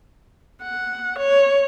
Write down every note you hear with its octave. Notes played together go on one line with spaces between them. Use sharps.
F#5
C#5